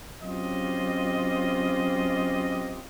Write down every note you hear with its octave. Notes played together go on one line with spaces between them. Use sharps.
F#3 C4 C#4 F4 G4 D#5